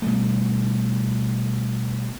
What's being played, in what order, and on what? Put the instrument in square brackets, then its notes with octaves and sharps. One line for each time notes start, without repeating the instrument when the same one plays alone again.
[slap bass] B2 G3 A3